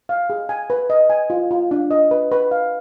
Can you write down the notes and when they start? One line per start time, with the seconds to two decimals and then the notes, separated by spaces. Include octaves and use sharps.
0.09 F5
0.30 G#4
0.49 G#5
0.70 B4
0.90 D#5
1.10 G#5
1.30 F4
1.51 F4
1.71 D4
1.91 D#5
2.11 B4
2.32 B4
2.51 F5